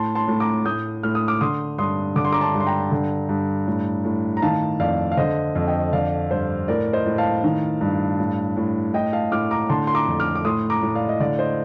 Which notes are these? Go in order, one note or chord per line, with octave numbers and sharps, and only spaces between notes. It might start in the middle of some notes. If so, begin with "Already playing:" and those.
Already playing: A2 A5 C6
A5 C6
A2
A#5 D6
A2 D#6 G6
A2 F6
D#6
D6 F6
D3 C6 D#6
G2 C6 D#6
D3 D6
C6
A#5 D6
A5 C6
G2
C6
G5 A#5
D3
G2
A2
A2
A#5
D#3 F5 A5
F2 D5 F5
F5
D3 C5 D#5
F2
D#5 G5
D3 D5 F5
G2 C5
A2 A#4 D5
C5 D#5
A2
F5 A5
D#3
G2
A2
A2
A2 D#5 G5
F5 A5
A2 D6 F6
A#5 D6
D3 A5 C6
C6
A#5 D6
F2
D6 F6
D6
A2 C6 D#6
A#5 D6
A2
D5 F5
D#5
D3 D5 F5
C5 D#5